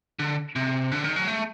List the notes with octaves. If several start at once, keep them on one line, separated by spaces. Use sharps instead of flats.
D3
C3
D3
D#3
F#3
A3